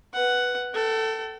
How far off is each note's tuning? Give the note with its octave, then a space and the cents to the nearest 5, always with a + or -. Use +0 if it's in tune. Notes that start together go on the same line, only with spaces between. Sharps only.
B4 +0 F#5 +5
A4 +15 G5 -45